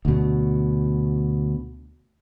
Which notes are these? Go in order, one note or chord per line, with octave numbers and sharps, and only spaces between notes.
D2 B2